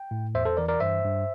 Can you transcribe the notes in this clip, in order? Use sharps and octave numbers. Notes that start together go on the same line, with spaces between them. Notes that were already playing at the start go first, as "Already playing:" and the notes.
Already playing: G5
A2
E2 C5 E5
A4 C5
E3 A#4 D5
A#4 D5
G2 C5 E5
G2